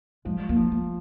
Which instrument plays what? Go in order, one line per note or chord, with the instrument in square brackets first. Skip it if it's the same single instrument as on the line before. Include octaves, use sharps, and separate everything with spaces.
[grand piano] F3 [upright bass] G#3
[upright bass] A#3
[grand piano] F3
[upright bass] A3